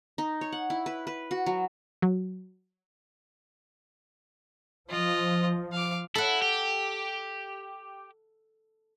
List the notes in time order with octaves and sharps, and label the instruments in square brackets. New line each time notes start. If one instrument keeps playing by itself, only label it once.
[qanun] D#4
C#5
F#5
E4
B4
B4
F#4
F#3
[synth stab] F#3
[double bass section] F3 [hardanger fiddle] F4 D#5
[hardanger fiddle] F5 D6
[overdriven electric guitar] E4 [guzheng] A4 F#5
[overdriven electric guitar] G4